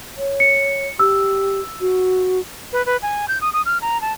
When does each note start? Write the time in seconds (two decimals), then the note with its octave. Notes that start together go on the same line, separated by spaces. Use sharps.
0.18 C#5
0.40 C#7
0.99 G4 E6
1.81 F#4
2.73 B4
2.86 B4
3.02 G#5
3.28 G6
3.41 D#6
3.53 D#6
3.66 F6
3.82 A#5
4.01 A5